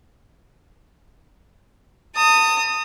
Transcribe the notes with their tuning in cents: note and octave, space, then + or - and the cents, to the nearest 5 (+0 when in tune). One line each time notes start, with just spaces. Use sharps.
A5 +40 D#6 +0